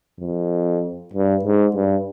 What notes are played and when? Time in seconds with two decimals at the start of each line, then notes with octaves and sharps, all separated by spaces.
0.20 F2
1.13 G2
1.44 G#2
1.75 G2